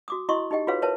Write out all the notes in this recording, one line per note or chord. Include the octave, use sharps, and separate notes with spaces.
F#4 D6 D#6
E4 F#4 D#5 C6 C#6 D#6
D#4 G4 D#5 G5
F4 F#4 G#4 B4 C#5 F5
A#4 B4 C#5 E5 A5